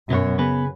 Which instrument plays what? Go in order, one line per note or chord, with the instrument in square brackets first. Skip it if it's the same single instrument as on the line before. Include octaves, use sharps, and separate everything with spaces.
[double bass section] F#2 [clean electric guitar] B2 B3 F#4 C#5
[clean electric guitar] C#3 B3 G#4 B4